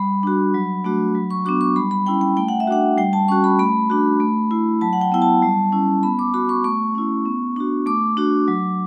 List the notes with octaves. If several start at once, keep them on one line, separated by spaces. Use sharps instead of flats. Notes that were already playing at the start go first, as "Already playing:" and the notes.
Already playing: G3 B5
D4 F#4
F#3
A3 D4 F#4
F#3
C#6
B3 D4 F#4 D6
C#6
G3 B5
B5
C#4 E4 G5
G5
A3 G5
F#5
E5
D4 F#4 F#5
G3 G5
A5
C#4 F#4 C#6
B5
A3 B5
D4 F#4
A3
E4
F#3 A5
F#5
G5
B3 E4 G5
A5
G3
C#4 E4
B3 B5
D6
F#4 B5
C#6
A3 C#6
C#4 E4
B3
D4 F#4
A3 D6
D4 F#4
F#3